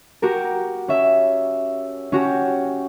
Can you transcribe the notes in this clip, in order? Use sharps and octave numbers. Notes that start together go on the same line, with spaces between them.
F#4 G4 A#4
C#4 E5
C#4 F#4 G4